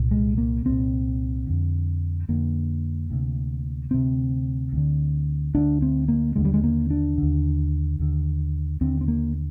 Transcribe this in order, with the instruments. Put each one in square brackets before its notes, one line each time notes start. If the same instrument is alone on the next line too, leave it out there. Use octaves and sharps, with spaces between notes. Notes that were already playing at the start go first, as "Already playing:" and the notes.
Already playing: [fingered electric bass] C2 A#2
G#3
A#3
C2 A#2 C4
F2 D3
F2 D3 A#3
D2 C3
D2 C3 C4
D2 D3
D2 D3 D4
C4
A#3
D#2 D3 G#3
G3
G#3
A#3
D4
D#2 D3
D#2 D3
D#2 D3 C4
C4
A#3